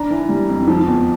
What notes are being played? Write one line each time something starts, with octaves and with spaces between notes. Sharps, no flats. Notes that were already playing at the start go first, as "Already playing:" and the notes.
Already playing: D4 A#5
E3
G3
F2
F3
E2